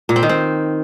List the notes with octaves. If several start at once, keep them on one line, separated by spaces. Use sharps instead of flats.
A#2
C4
D#3
C4